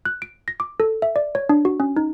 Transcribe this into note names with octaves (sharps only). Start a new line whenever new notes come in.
F#6
D7
A#6
D6
A4
E5
D5
C#5
D4
F#4
C#4
D#4